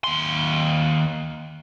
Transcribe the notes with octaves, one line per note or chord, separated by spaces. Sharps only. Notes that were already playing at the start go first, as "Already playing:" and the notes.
D#2 C6